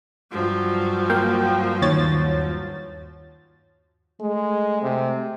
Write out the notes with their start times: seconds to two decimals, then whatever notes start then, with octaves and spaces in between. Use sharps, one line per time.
0.32 G2 F3 F#3
1.10 A#3 F5 G5
1.82 D#2 C#5 A6
4.21 G#3 A3
4.82 C3